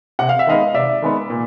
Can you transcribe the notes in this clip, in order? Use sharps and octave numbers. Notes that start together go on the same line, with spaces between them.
C3 F#5
F5
E5
D#3 G#3 B3 D#5 F5
C3 D5 E5
D#3 G#3 B3
A#2